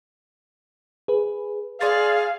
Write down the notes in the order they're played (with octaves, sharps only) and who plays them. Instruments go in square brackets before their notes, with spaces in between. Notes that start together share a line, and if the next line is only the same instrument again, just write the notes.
[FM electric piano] G#4 B4
[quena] G#4 [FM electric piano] D5 C6 A6 [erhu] F5